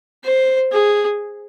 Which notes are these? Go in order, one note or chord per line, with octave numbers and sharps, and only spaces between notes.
C5
G#4